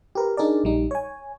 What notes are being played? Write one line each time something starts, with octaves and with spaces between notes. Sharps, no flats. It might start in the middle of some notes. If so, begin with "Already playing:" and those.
G4 A#4 B4
D4 D#4 G#4 A#4 D5
A#1 G3 D#4
C#5 G#5